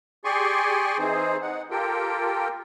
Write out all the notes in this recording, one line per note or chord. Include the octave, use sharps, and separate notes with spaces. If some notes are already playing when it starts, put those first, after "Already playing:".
G4 G#4 D5 G#5 C6 C#6
E3 C4 D#4 G#4 C5
D#4 F#5
F4 G4 A4 A#4 G5